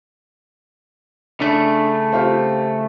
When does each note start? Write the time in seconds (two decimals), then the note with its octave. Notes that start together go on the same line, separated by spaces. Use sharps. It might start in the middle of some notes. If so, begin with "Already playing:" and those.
1.40 C#3 A3 D4
2.12 C4 F4 G4